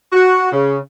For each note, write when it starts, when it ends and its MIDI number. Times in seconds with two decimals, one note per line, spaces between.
0.13 0.51 66
0.52 0.78 49